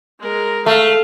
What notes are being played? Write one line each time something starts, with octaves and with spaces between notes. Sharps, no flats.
G#3 A#4
A3 F5